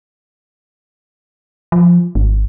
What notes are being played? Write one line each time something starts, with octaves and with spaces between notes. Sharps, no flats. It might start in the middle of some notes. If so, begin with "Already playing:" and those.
F3
G#1